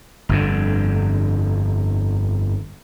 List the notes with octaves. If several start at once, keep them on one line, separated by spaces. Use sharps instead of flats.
G1 F2 D3